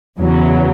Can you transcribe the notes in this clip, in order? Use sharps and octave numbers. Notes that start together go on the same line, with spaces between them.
E2 C#3 F#3